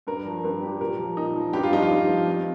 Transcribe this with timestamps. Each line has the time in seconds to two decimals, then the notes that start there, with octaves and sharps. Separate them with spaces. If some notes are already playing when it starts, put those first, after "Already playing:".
0.07 G2 A#4
0.26 F3
0.44 G2 A#4
0.62 F3 G4
0.81 A#2 A#4
0.99 F3
1.17 A#2 D#4
1.36 F3
1.53 G2 G4
1.63 F4
1.72 F3 D#4
1.82 F4
1.90 G2
2.09 F3
2.27 F2